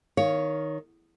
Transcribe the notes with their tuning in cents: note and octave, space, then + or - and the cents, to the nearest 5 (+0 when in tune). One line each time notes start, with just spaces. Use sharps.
D#3 +0 C#5 +10 F5 +0